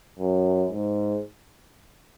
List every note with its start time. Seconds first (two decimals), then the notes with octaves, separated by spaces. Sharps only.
0.19 F#2
0.71 G#2